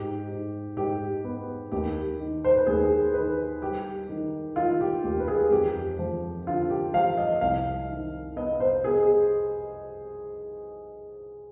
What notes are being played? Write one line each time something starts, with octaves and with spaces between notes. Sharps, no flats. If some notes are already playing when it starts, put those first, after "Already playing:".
Already playing: G#2 G4
G#2
G#2 G4
B3
D#2 G4
D#3
C5
B4
D#2 G#4
D#3 B4
G3 G4
D#3
D#3 F4
G4
D#2 G4
B4
G#4
F2 G4
F3
D3 F4
G4
F3 F5
D#5
C2 F5
D#3
B3 D#5
C5
B3 G#4